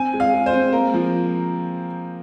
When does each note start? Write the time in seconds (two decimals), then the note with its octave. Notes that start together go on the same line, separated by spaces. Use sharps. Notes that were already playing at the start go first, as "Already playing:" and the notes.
Already playing: C4 G#5
0.13 G#3
0.20 F5
0.34 G#3
0.46 C5
0.53 C4
0.73 A#3 A#4
0.94 F3